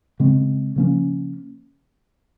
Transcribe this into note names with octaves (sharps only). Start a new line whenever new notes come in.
C#3 G#3 C4
C#3 F3 A#3 C#4